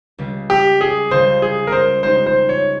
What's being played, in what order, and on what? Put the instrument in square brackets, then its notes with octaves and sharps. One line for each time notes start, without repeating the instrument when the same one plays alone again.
[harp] C#2 C#3 G3
[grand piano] G4
G#4
[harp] C#2 C#3 G3 [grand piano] C5
[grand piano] G#4
A#4
C5
[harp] C#3 G#3 D#4 G4 [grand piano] C5
[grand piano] C5
C#5